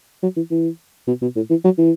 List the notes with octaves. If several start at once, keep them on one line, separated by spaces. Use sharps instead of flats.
F#3
E3
E3
B2
B2
A2
E3
F#3
E3